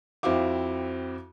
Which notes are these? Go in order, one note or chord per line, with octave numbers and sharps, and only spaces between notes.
F2 C4 E4 F#4 F5 D6